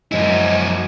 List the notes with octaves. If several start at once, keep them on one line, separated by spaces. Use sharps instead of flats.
F#2 F3 F#3 G#3 E4 D#5